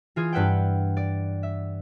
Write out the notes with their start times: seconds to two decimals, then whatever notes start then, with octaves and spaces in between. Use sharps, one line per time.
0.16 E3 F4 G#4 G#6
0.33 G2 B4 E5 F#5 G5
0.97 D5
1.43 E5